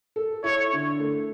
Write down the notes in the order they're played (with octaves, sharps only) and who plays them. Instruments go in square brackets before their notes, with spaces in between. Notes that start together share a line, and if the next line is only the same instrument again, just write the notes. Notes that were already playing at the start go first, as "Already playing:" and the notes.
[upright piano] A4
[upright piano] E4 [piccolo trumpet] C#5
[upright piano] D3
A3